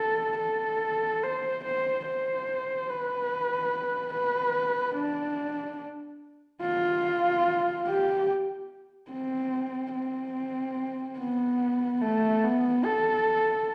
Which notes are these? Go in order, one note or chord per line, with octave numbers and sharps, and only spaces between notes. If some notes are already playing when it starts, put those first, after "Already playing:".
Already playing: A4
A4
C5
C5
C5
B4
B4
D4
F4
G4
C4
C4
B3
A3
B3
A4